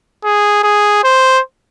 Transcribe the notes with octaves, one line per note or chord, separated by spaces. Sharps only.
G#4
G#4
C5